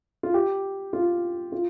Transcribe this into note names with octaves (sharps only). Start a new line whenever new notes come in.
F4
G4
F4
F4